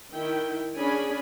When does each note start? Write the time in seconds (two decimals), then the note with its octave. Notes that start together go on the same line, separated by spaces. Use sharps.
0.12 D#3 E4 G5
0.77 C#4 D4 G#4 G#5 B5